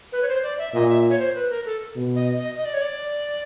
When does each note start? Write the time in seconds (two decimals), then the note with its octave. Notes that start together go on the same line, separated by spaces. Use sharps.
0.12 B4
0.22 C#5
0.28 C5
0.43 D5
0.59 E5
0.74 A#2 D#5
0.88 E5
1.10 C#5
1.19 C5
1.35 B4
1.50 A#4
1.66 A4
1.96 B2
2.16 D#5
2.37 D#5
2.57 D#5
2.65 D5
2.74 C#5
2.82 D5